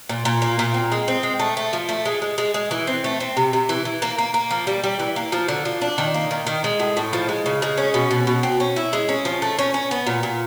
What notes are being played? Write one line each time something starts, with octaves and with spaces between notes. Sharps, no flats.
A#2
A#2
A#3
A#2
C4
G#3
C4
G#3
A3
A3
F3
A3
G#3
G#3
G#3
G#3
E3
C4
A3
C4
C3
C3
E3
E3
A#3
A#3
A#3
F3
G3
G3
E3
A#3
F3
D3
F3
D4
D#3
A#3
D#3
D#3
G#3
A2
A2
F3
G#3
C#3
G#3
C#4
B2
B2
B2
C4
C#4
E4
G#3
C#4
F3
A3
C#4
C#4
B3
A#2
A#2